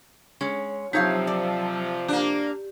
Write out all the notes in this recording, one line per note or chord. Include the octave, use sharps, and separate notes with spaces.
G#3 C#4 C#5
C3 F3 F#3 D#4 C#5 F5 A5 E6
D5
A#3 D4 G4